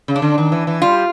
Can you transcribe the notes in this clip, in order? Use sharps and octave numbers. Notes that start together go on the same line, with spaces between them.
C#3
D4
D3
D#3
E3
E3
G3 F4